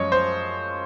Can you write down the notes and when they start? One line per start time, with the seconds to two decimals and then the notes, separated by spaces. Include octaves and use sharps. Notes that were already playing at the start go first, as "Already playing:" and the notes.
Already playing: F#2 F3 G#3 C#5 D#5
0.12 C5